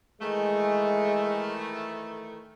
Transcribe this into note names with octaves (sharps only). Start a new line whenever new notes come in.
D#3 E3 G#3 A3